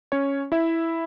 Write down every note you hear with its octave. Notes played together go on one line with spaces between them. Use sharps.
C#4 C#5
E4 E5